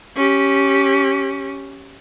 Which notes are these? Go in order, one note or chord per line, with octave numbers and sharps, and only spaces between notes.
C#4 G4